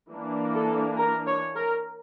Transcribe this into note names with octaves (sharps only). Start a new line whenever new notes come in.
E3 A#3 D4
A4
A#4
C#5
A#4